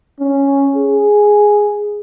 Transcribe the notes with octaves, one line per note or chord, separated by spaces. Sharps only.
C#4
G#4